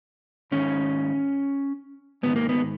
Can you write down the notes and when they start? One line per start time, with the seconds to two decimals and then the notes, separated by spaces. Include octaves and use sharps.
0.52 G#2 D#3 C#4
2.23 G#2 D#3 B3
2.36 A#3
2.49 B3